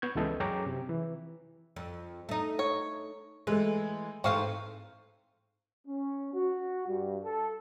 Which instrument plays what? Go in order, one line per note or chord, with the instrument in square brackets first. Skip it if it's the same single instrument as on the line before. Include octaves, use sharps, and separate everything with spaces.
[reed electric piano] B3 C#6 G6 G#6
C#2 C#3 E3 B3 A4 D#5
F#2 G#4 C#5 G5 A#5 D6
C3
E3
[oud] F2
A3 D#4
[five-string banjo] C#5
[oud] E3 [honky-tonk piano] G#3 A3
[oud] G#2 E3 A3 [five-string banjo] C4 C5 F5 [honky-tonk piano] C#6
[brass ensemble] C#4
F#4
G2
A4